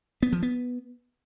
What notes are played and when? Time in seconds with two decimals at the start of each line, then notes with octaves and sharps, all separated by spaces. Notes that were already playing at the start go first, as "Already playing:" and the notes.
0.23 B3
0.33 F3
0.43 B3